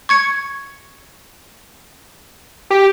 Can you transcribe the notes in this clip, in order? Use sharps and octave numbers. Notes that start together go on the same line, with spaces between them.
C#6 G#6 C#7
G4